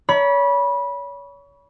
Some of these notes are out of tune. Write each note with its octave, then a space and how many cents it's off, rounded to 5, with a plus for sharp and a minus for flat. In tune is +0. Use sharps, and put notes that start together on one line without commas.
C#5 +35 B5 -20